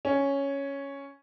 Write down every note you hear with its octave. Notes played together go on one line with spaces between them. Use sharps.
C#4